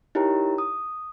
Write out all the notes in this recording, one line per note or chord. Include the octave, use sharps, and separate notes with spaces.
D#4 E4 G4 A#4 C#5 A#5
D#6